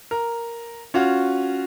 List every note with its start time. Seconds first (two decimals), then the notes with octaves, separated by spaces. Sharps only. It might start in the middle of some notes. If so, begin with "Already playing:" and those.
0.11 A#4
0.94 C#4 F4 F#4